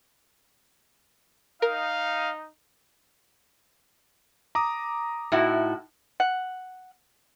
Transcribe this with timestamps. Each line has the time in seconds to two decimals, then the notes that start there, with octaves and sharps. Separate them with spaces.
1.62 D#4 A#4 F5
4.55 A#5 D6 D#6
5.32 A2 D#4 E4 F#4
6.20 F#5